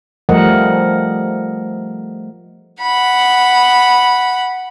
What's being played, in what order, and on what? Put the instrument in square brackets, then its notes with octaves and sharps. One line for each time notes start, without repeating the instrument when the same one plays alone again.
[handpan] F3 G3 A3 A#4 D#5 F#5
[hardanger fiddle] F#5 B5